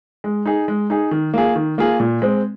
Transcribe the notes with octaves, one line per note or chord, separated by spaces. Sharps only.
G#3
D#4 G#4
G#3
D#4 G#4
D#3
A#3 F4 G#4
D#3
A#3 F4 G#4
A#2
G#3 C4